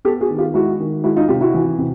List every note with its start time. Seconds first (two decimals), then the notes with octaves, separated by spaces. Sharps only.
0.05 B3 G4 A4
0.21 F#4 G#4
0.30 D#3
0.39 F4 G4
0.54 G#3 E4 F#4
0.80 D#3
1.04 G#3 E4 F#4
1.16 D#4 F4
1.28 C3 F4 G4
1.41 E4 F#4
1.54 E3
1.78 C3